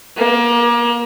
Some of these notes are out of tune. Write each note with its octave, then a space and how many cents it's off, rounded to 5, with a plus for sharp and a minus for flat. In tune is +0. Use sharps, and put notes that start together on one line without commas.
A#3 +30